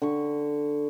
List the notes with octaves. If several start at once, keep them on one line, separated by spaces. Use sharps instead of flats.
D3 C#6